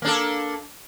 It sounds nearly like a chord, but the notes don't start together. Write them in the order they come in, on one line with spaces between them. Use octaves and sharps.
A#3 D4 A4